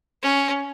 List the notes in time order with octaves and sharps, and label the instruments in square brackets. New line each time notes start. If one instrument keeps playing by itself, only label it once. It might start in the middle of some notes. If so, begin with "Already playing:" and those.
[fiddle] C#4